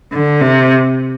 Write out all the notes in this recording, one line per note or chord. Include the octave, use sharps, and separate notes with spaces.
D3
C3